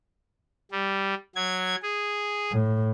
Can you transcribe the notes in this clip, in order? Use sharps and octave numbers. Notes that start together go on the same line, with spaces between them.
G3
F#3 G#6
G#4
A2